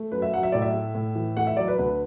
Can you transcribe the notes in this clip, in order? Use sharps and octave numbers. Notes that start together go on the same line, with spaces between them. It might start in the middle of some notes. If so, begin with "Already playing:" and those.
Already playing: A3
F#2 B4
E5
F#3 F#5
E5
A2 D5
E5
A3
A2
E3
A3 F#5
E5
F#3 D5
B4
D2 B4